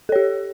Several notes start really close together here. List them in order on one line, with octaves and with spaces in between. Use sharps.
A4 C#5 G4